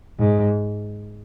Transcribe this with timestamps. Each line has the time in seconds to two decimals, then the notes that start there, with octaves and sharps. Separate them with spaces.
0.19 G#2